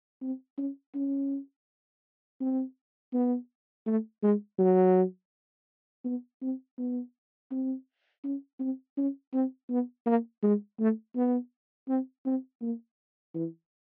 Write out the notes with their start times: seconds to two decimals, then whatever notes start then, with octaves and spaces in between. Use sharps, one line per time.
0.22 C4
0.58 C#4
0.95 C#4
2.40 C4
3.13 B3
3.86 A3
4.23 G#3
4.59 F#3
6.05 B3
6.42 C4
6.78 B3
7.51 C4
8.24 C#4
8.60 C4
8.97 C#4
9.33 C4
9.70 B3
10.06 A#3
10.43 G#3
10.79 A3
11.15 B3
11.88 C4
12.25 C4
12.61 A#3
13.35 E3